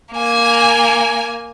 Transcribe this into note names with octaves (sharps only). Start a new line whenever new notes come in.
A#3 G#5